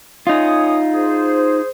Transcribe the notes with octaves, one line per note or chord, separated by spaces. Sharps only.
D#4 F4 C#5 G#5 D#6
G#4 C5